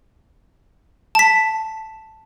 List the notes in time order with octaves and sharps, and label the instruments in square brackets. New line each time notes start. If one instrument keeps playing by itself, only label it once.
[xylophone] A5 B6